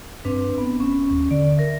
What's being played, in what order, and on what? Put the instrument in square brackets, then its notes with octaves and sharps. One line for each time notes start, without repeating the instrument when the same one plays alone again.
[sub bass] G2 [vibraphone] C4 D4 B4
[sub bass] F1 [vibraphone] B3
[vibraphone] C#4
[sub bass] D#2
[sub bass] D3 [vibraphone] D5
[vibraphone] A#4 E5